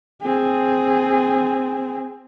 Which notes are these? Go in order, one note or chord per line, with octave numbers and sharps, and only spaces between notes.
C4 G#4